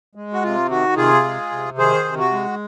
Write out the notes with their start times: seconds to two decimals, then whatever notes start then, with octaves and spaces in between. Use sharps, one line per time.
0.15 G#3
0.33 F#4
0.43 C3 F4
0.70 D#3 F#4
0.97 C3 F4 G#4
1.24 G#3
1.51 C3
1.78 D#3 G#4 C5
2.05 C3
2.19 F#4
2.32 G#3